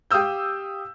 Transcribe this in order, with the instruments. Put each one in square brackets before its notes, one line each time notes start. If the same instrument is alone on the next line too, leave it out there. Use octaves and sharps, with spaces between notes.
[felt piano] G4 F5 D#6 E6 G6